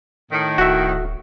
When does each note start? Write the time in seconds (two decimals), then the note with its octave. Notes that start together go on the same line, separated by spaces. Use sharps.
0.31 A2 D#3
0.58 D1 F#4 E5